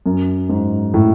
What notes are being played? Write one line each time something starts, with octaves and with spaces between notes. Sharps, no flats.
F#2
G#2
A2